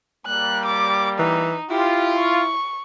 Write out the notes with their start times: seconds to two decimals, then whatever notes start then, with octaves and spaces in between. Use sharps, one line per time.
0.27 G3 A#3 F#6
0.66 D6
1.19 E3 D#4
1.70 E4 F4 G4
2.18 C#6